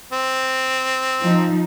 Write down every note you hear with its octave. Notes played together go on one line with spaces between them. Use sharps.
C4
F3 D#4